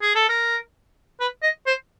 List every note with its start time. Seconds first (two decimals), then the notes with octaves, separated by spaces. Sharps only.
0.02 G#4
0.16 A4
0.29 A#4
1.20 B4
1.43 D#5
1.67 C5